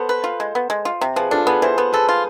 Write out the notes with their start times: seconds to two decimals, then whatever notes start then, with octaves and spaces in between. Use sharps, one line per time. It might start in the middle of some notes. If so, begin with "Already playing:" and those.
Already playing: B3 A4 C5
0.09 B4
0.24 F4
0.40 G#3
0.55 B3
0.70 G#3
0.85 F4
1.01 C3
1.16 F3 G#4 B4
1.31 D4 F4 A4
1.47 B3 G#4 B4
1.62 E3 A4 C5
1.78 B3
1.93 G#4 A4 B4
2.09 F4